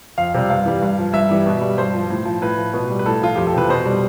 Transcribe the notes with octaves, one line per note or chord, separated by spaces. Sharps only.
F2 F5
C3 G3
G2 F5
E3 G3
G2
F3
G2 E5
E3 G3
B2
G3
G2 C5
F3
A2
F3
A2 B4
F3
B2
G3
B4
A2 A4
F3 F4
F2 G4
A4
C3 E3 B4
B2 C5
G3